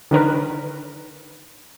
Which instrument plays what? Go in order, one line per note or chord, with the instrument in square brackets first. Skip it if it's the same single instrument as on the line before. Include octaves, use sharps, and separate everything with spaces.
[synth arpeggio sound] D3 D#3 A#4 B4